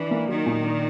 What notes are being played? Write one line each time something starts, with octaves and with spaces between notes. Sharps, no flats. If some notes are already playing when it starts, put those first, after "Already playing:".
Already playing: E3 D4
A#3
D#3 F#3
A#2
D4